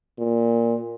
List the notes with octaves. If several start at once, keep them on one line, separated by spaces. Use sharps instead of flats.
A#2